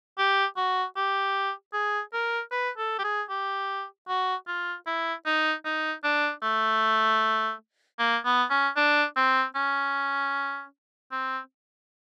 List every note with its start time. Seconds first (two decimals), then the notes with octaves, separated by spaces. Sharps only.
0.18 G4
0.57 F#4
0.96 G4
1.73 G#4
2.13 A#4
2.52 B4
2.78 A4
2.99 G4
3.04 G#4
3.30 G4
4.08 F#4
4.47 F4
4.87 E4
5.26 D#4
5.65 D#4
6.04 D4
6.43 A3
7.99 A#3
8.25 B3
8.50 C#4
8.77 D4
9.17 C4
9.56 C#4
11.12 C4